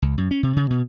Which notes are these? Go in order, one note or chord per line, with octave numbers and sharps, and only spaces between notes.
C#2
F#2
C#4
C3
C#3
B2